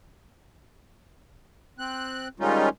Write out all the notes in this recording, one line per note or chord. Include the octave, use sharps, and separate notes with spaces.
C4 F#6
D#3 G3 G#3 C#4 D#4 F4